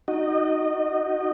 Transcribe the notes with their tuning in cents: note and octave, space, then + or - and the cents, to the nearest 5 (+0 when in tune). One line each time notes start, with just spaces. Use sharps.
D#4 +0 F#4 +0 D#5 -25